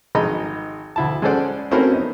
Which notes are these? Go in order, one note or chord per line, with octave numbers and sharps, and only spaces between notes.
G#1 G#3 D#4 D#5 A#5 B5
D2 E4 A5
G#3 C#4 A4 C5 D5 F#5
A3 C4 C#4 E4 F#4 A#4
B3 D#4